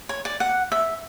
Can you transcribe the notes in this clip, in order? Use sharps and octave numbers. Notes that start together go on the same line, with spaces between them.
C#5
D5
F#5
E5